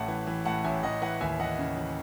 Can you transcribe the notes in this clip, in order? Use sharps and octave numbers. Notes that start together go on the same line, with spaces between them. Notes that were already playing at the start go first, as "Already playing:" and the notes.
Already playing: A1 A2 E5 F#5 A5
E3
E3
A2 F#5 A5
A1 E5 G#5
A1 D#5 F#5
E3 D#5 F#5
D#2 E5 G#5
E3 D#5 F#5
C#3
E3